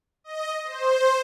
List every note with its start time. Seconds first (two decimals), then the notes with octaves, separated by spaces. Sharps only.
0.24 D#5
0.64 C5